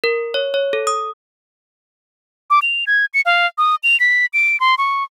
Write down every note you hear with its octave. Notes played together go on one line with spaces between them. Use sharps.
A#4
C#5
C#5
A4
D#6
D6
F7
G#6
C#7
F5
D#6
F7
B6
D7
C6
C#6